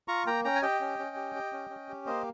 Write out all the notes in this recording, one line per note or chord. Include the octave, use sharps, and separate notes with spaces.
F4 A#5 C#6
A#3 G5 A#5
C#4 G5 A#5
G#5
G4 D#5 G5
C#4
C#4
G4
G4
C#4
C#4
G4
A#3 C5 D#5